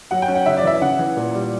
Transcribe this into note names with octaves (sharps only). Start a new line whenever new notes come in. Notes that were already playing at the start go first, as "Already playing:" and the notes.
F#3 F#5
G5
C#4
F#5
C#3 E5
D5
E3 E5
C#3 F#5
E3
A#2
G3